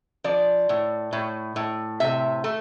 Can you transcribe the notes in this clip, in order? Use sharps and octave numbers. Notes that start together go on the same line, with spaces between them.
F3 D5
A2
A2
A2
C3 E5
A3